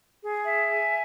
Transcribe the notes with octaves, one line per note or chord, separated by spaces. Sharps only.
G#4
E5
G#5